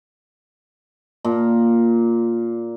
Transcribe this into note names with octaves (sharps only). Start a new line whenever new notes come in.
A#2